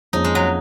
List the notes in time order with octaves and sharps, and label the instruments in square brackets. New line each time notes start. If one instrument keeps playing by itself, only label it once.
[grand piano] F2 F3 A#3 C#4 G#4 [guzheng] D#4
[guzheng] G#3
F#3